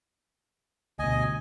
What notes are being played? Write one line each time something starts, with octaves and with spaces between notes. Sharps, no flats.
D2 B2 D#5 G#5